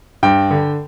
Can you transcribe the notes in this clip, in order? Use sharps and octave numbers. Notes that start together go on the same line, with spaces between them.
G2 G5
D3